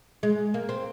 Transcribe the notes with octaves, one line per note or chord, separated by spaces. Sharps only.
G#3
A#3
C4